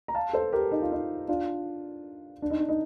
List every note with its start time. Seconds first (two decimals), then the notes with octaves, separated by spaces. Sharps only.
0.08 A#5
0.15 F5 A5
0.33 A4 C5
0.53 G4 A#4
0.71 D#4
0.82 F4
0.92 D#4
1.28 D4 F4
2.42 D4
2.50 D#4
2.60 D4
2.69 D#4